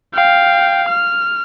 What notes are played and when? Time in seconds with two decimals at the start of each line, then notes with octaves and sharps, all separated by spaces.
0.14 F5 G5
0.88 F6